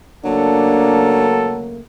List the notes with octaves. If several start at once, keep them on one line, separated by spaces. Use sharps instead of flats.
C#3 F#3 A3 A#3 D4 A4